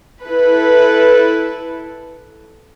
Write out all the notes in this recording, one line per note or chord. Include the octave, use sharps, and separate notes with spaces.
E4 A4 B4